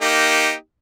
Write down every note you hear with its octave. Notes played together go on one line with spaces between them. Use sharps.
A#3 D#4 G4